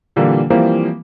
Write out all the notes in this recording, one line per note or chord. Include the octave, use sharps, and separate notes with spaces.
A#2 D3 E3 G3 A#3
E3 F3 G3 A#3 C4 E4